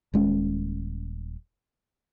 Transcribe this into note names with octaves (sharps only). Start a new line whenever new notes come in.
D#1 G#3 C#4